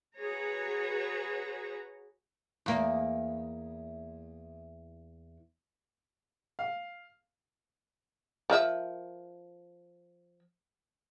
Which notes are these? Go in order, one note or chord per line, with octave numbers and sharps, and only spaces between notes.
F#4 G#4 B4 C#5 A#5
E2 A#3
F5
F3 A#4 E5